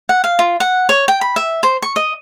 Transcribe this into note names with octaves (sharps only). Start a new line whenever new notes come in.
F#5
F5
F4
F#5
C#5
G5
B5
E5
C5
C#6
D#5